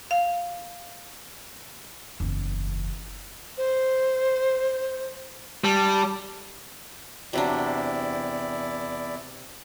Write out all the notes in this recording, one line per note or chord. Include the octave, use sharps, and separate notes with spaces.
F5
F#1 E2
C5
G3 A5
E2 C3 F#3 D4 E4 D5